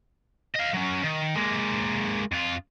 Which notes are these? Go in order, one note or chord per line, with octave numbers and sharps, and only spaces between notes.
D#5 F5
F#3 C#4
D#3
G#3 A#3
F2 F4